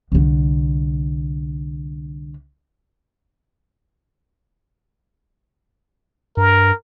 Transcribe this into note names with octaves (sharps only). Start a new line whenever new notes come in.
C2 D3
G2 A#4